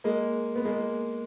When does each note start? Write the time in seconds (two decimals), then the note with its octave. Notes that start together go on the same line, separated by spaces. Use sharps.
0.04 G#3 A#3
0.55 B3
0.65 G#3 A#3